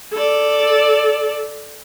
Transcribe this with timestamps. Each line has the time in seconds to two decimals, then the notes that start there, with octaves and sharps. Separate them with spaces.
0.14 A4 D5